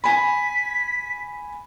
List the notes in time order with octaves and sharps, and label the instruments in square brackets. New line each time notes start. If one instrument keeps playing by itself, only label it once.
[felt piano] G#5 B5 [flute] B6